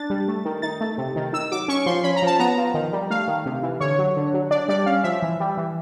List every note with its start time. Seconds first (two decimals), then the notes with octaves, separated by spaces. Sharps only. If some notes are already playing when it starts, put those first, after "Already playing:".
Already playing: D4 A6
0.10 G3
0.28 A3
0.45 D#3
0.62 D#4 A6
0.81 A3
0.98 C3
1.16 D#3
1.33 D#4 E6
1.51 F#3 D6
1.68 C#4 C#6
1.86 F3 C6
2.04 C#4 B5
2.16 A#5
2.22 F3 A5
2.39 B3 A#5
2.58 F3
2.74 D#3
2.93 G3
3.10 A3 F5
3.28 D#3
3.46 C3
3.63 E3
3.81 D3 C#5
3.99 F#3
4.17 D3
4.34 F#3
4.51 D4 D5
4.68 G3 D5
4.86 C#4 F5
5.04 F3 E5
5.23 E3
5.40 G3
5.57 E3